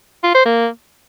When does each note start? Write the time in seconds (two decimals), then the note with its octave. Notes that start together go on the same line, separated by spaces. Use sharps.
0.24 F4
0.35 C5
0.46 A#3